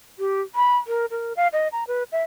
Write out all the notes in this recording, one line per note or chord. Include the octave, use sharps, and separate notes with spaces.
G4
B5
A#4
A#4
F5
D#5
A#5
B4
E5